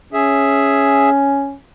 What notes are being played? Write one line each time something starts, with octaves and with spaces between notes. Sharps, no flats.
C#4 G#4 E5